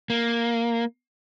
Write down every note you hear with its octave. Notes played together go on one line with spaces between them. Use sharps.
A#3